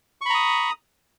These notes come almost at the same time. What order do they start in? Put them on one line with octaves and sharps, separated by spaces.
C#6 B5 A#5 D#6